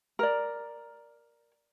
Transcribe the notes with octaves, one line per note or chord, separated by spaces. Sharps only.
A#4 D5